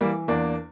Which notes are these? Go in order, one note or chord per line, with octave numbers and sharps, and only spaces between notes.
E3 G3 A#3
E2 A#3 D4